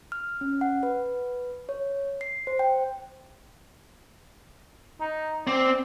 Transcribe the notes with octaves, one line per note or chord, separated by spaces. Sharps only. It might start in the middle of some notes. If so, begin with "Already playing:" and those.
F6
C#4
F#5
B4
C#5
C7
C5
G5
D#4
C4 D5